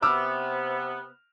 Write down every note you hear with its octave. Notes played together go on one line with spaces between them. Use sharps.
C3 B3 D6 E6 F6